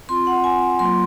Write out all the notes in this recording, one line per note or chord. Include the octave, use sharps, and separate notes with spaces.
C4 F4 C6
F#5
G#5
F#3 A#3 F4 C6